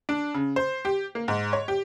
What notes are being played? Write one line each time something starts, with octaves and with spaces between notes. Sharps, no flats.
D4
C#3
C5
G4
A#3
G#2
C#5
G4